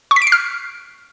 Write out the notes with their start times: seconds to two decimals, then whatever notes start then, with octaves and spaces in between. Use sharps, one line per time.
0.11 C#6
0.16 B6
0.22 D7
0.27 C7
0.32 F6